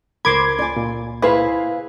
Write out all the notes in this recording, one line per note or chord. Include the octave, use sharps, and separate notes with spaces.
C#2 A#4 C5 B5 C6 D6 G#6
D5 G#5
A#2
E4 G#4 B4 C5 F5